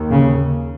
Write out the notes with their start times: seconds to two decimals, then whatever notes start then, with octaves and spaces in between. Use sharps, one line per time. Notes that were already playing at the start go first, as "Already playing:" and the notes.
Already playing: D#2
0.11 C#3